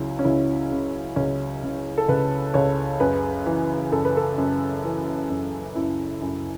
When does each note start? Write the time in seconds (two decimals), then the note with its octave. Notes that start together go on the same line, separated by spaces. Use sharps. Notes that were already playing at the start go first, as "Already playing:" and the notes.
Already playing: C#2 F#3 E4
0.19 C#4
0.24 C#2 E4
0.71 C#3
1.16 C#2 C#4
1.63 C#3
1.98 A4
2.09 C#2 B4
2.54 C#2 C#5
3.00 F#2 B4
3.46 E3
3.91 F#2 A4
4.05 B4
4.17 A4
4.38 F#2
4.84 E3
5.30 F#2
5.75 F#2 E4
6.22 F#2